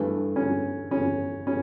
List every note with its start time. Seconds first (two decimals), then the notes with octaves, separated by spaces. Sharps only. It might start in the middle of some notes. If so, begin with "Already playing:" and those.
Already playing: G2 E3 A3
0.36 C#4
0.91 C#4
1.47 C#4